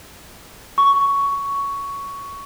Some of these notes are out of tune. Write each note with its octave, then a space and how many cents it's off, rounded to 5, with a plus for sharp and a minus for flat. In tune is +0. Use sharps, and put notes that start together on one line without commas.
C#6 +10